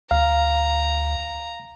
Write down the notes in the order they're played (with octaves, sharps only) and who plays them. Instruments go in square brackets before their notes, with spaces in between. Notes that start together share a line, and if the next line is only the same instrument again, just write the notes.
[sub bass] D2 [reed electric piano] F5 [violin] A#5